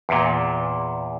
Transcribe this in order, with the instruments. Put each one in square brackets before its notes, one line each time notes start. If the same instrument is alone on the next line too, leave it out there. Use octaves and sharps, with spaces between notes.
[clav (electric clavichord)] E2 A#2